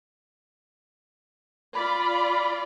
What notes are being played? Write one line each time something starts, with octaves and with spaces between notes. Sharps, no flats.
F4 D5 B5